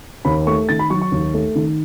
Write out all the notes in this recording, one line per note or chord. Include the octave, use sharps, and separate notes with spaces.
D#2 B5
A3 C#6
D#3 A6
B5
F#3 C#6
C#6
D#2
A3
D#3